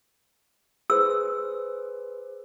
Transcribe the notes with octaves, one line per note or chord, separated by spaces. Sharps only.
G#4 B4 C5 E6